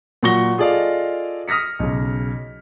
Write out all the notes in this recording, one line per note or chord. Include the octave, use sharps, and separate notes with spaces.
A#2 F#3 F#5 C#6 A#6 G7
F4 G#4 A4 D5 D#5 F5
D#6 F6 A#6 B6 C#7
B1 C#3